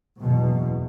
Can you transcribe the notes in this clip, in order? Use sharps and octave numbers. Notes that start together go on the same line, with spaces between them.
F#1 E2 B2